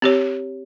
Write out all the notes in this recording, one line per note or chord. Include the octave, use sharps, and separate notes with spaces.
C4 G4 C#5